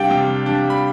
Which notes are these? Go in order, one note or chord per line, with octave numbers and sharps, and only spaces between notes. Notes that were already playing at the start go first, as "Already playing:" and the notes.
Already playing: C3 G3 D4 D5 F5 G5
C3
G3 D4
B5